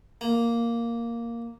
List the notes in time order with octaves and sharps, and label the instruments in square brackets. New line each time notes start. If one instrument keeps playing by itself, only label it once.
[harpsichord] A#3